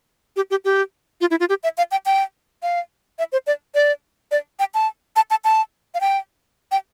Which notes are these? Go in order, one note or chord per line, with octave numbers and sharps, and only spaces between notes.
G4
G4
G4
F4
E4
F4
G4
E5
F5
G5
G5
F5
E5
C5
D5
D5
D5
G5
A5
A5
A5
A5
F5
G5
G5